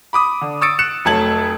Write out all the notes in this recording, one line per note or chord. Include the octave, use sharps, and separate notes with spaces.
B5 D6 D#6
D3
C#6 D#6 E6 A6 C#7 D7
F#6 C#7 E7
F1 F#3 A3 A5 G#6 F#7